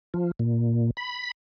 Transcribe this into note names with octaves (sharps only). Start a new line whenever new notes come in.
F3
A#2
B5